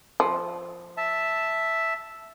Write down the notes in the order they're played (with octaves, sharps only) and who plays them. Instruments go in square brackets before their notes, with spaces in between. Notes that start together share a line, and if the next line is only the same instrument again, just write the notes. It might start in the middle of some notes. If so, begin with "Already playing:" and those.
[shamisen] F3
[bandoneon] E5 A5